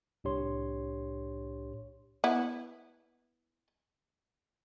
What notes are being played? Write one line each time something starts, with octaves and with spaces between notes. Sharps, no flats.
C2 A2 D4 G4 C#5 C6
B3 E4